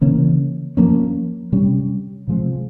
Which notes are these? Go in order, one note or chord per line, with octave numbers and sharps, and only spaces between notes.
C#3 E3 A#3 C#4
F3 A#3 C#4
C3 G3 C#4
C3 F3 G#3 C4